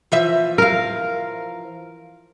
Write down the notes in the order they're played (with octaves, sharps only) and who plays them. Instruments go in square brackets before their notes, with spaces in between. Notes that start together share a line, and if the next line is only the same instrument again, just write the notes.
[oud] E3 F3 E5
[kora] A#4 F5